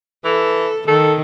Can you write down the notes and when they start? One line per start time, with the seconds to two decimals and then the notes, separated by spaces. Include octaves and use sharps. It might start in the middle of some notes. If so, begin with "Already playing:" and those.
0.25 E3 A4
0.88 D#3 A4